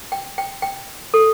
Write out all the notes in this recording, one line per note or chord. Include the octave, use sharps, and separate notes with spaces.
G5
G5
G5
A4